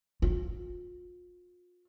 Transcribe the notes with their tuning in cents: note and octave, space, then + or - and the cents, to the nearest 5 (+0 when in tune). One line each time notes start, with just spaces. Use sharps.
F4 +35